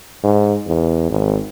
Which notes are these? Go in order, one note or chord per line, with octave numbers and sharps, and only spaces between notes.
G#2
E2
G#1